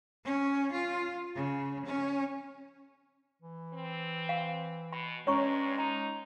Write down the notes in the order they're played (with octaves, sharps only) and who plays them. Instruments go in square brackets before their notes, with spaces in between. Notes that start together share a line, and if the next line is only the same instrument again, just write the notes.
[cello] C#4
F4
C#3
C#4
[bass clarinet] E3
[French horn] C4
[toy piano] F5
[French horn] B2 [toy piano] B5
[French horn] G2 [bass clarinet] G#3 [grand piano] C#4 [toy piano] C#5 A#5 C#6
[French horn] D#4 [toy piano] A#5